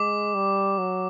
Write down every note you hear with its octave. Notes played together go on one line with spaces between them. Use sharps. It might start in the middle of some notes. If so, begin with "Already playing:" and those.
Already playing: G#3 D6
G3
F#3